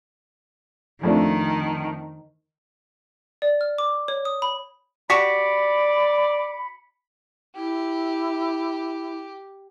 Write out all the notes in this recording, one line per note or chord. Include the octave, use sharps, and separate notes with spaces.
F2 D#3 A3 D4
D5
F6
D6
C#5
D#6
B5
F#4 G4 D5 B5 B6 C#7
E4 G4